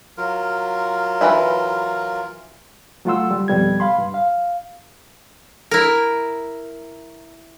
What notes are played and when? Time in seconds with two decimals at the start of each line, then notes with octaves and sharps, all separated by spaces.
0.17 F#3 F4 A#4
1.21 E3 B4 E5
3.05 F#3 A3 F4 F#5 C6 E6
3.31 G3
3.48 F2 B2 G3 G#6
3.80 F5 B5 C6
3.98 G2
4.14 F5
5.71 E4 A#4